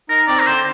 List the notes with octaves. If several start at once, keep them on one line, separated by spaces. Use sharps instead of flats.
D#4 A#4
C4 D5
A#4
D3 C5